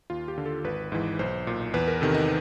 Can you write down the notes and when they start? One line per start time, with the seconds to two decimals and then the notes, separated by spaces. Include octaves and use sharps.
0.10 D#2 F4
0.28 G4
0.38 D3
0.46 A4
0.64 G#1 B4
0.92 G#2 E3
1.19 B1 C5
1.47 A#2
1.74 E2 B4
1.88 A#4
2.01 C3 D#3 A4
2.14 D#4